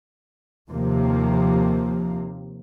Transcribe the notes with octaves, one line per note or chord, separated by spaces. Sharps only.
D#2 C3 F3 A#3